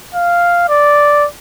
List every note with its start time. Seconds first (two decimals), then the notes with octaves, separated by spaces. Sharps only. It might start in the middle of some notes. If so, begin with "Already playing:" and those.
0.15 F5
0.69 D5